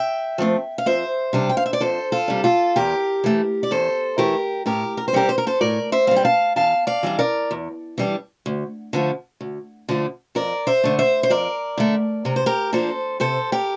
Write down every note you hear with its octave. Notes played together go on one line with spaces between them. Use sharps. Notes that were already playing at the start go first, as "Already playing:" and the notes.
Already playing: E5 G5
F3 A3 C4
F5
F2 C5 E5
C3 G3 D4
G5
F5
E5
D5
F2 A4 C5
F4 A4
C3 G3 D4
F4 A4
E2 G4 A#4
E3 A3
D5
E2 A4 C5
E3 A3 G4 A#4
A2 G4 A#4
A#4
C5
G3 C4 G4 A#4
C5
A#4
A4 C5
A2 A#4 D5
C5 E5
G3 C4 F5
G5
F5 A5
E2 F5 A5
D5 F5
E3 G3 D4
A#4 D5
E2
E3 G3 D4
D2
D3 F3 A3
D2
D3 F3 A3
F2 A#4 D5
C5 E5
D3 A3
C5 E5
C5
F2 A#4 D5
D3 A3
C3 A#4
C5
G4 A#4
F3 A#3 D4 A4 C5
C3 A4 C5
G4 A#4